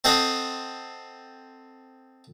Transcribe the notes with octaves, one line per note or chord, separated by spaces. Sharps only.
C4 A4 C5 D#5 F#5